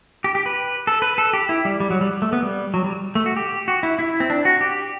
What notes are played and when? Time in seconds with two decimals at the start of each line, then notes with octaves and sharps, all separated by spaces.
0.24 G4
0.35 G4
0.46 B4
0.87 A4
1.02 B4
1.18 A4
1.33 G4
1.49 E4
1.65 G3
1.80 G3
1.90 F#3
2.01 G3
2.22 A3
2.33 B3
2.43 G3
2.74 F#3
2.84 G3
3.15 A3
3.26 F#4
3.37 G4
3.68 F#4
3.83 E4
3.99 E4
4.20 C4
4.30 D4
4.45 F#4
4.61 G4